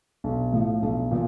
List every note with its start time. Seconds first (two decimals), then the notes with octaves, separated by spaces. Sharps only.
0.24 B1
0.53 A2 F3
0.82 B1
1.11 A#2 F3